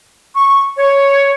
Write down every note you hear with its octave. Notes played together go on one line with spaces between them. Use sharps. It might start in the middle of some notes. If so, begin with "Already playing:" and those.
C#6
C#5